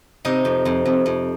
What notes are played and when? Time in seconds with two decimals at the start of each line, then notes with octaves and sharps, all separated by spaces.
0.25 C3 D#4
0.45 F2
0.65 F2
0.85 F2
1.06 F2